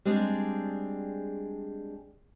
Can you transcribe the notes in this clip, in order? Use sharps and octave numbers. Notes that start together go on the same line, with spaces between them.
G3 G#3 C4 D4 G#4